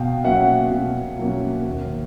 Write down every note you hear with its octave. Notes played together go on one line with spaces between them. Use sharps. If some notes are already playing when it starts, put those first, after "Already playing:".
Already playing: B2 F5 G5
F#3 A#3 C#4 E5 F#5
B2
F#3 A#3 C#4
D#2